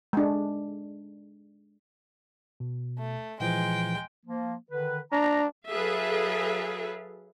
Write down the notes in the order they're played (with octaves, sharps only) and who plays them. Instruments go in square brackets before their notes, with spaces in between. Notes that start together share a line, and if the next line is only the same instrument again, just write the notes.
[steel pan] G#3 D4
[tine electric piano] B2
[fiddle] A3
[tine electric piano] A#2 E3 F3 [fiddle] G#3 G5
[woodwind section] F3 A#3
D3 D#3 B4
[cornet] D4 [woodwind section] A#5
[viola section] F#3 G#4 A4 B4 E5 F5